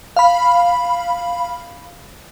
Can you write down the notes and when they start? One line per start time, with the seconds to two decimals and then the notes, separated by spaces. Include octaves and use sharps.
0.17 F5 B5